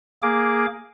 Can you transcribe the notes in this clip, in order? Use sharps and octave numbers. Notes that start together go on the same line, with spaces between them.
A#3 G#4 D6